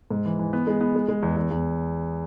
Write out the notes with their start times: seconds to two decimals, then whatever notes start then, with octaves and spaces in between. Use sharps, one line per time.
0.10 G#2
0.26 E3
0.39 E3
0.53 B3
0.67 G#3
0.81 B3
0.95 G#3
1.08 G#3
1.23 E2
1.36 E2
1.51 E2